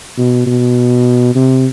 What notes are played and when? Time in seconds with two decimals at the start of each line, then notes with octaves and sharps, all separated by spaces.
0.18 B2
0.47 B2
1.36 C3